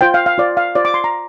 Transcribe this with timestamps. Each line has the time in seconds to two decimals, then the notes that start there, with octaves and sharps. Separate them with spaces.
0.01 F4 C5 G5
0.14 F5
0.26 F5
0.38 F4 C5 D5
0.57 F5
0.75 F4 C5 D5
0.85 D6
0.94 C6
1.04 A#5